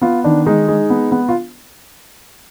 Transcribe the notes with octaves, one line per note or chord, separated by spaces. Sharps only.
B3 F4
D#3 D4
G#3 D#4
G#3
B3
B3
F4